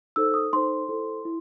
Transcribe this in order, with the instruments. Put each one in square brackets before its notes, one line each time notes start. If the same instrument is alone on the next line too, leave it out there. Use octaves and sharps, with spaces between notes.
[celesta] D#4 A4 C5 E6
D#6
D#4 A4 C5 C6
E4 A4 C5
E4